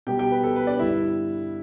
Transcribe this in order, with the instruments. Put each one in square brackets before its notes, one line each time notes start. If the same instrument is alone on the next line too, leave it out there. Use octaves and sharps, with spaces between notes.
[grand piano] B2 G3 B3 G4 G5
G4 G5
B4
A4
B4
D4 D5
G2 D3 G3 E4 E5